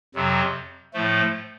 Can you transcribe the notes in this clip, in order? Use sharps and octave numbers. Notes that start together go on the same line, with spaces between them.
F2 C3 F#3
A2 F3 A3